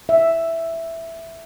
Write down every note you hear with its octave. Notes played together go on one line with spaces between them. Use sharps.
E5